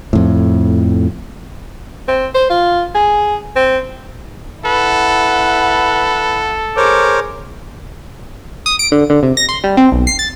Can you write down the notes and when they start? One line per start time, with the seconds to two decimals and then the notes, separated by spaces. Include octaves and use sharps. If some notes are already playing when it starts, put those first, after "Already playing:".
0.13 F2 A2
2.08 C4
2.35 C5
2.50 F4
2.95 G#4
3.56 C4
4.65 E4 A4 B4 F#5
6.77 G#4 A#4 C5 C#5 D6
8.66 D#6
8.79 D7
8.92 D3
9.10 D3
9.23 C3
9.37 A#6
9.49 C6
9.64 G3
9.77 C4
9.92 B1
10.07 C7
10.19 A6